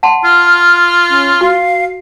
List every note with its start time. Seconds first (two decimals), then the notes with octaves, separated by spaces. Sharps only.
0.03 F#5 A5 C6
0.24 F4 F6
1.10 C#4
1.41 F#4 F5